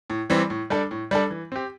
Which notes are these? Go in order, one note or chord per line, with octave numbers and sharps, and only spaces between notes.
A2
E3 G3 C4
A2
G3 D4 A4
A2
G3 D4 A4
E3
C4 G4